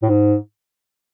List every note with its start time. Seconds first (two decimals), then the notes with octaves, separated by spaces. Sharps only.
0.03 A2
0.09 G#2